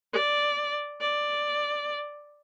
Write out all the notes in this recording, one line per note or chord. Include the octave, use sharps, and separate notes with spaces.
D5
D5